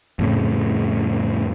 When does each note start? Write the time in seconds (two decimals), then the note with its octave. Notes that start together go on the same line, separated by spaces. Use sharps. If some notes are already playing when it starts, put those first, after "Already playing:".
0.19 F2 A2 C#3